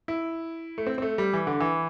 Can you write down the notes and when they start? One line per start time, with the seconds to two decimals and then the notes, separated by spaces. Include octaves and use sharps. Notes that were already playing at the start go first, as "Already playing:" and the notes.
0.08 E4
0.78 A3
0.87 C4
0.98 C4
1.02 A3
1.18 G3
1.33 E3
1.47 D3
1.60 E3